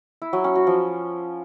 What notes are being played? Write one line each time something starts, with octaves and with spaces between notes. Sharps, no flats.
E4
F#3
C#4
F#4
F3